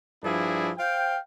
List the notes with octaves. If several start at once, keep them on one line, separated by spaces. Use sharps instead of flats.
G2 F3 D4 E4 G#4
C5 F5 G5